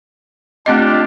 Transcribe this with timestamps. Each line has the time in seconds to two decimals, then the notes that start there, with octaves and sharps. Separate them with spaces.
0.66 A3 C4 D4 F4 G4 D#5